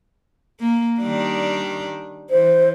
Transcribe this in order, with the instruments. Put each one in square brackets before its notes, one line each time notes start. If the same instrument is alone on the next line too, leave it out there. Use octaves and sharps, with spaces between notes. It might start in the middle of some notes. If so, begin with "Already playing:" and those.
[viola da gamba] A#3
D#3 G3 D4
[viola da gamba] E3 [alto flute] C5